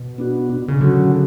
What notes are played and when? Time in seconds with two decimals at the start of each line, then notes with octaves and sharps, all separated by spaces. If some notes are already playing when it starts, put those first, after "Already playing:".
Already playing: B2
0.18 B3 D4 F#4
0.50 B2
0.68 C#3
0.80 D3 F#3 C#4 F#4